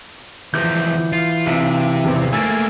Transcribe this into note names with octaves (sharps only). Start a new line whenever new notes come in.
E2 E3 F3 D6 G6
F4
B1 C3
G#1 E2
A3 A#3 G#5 E6 G#6 A6